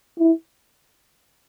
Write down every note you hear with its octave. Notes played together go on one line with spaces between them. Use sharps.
E4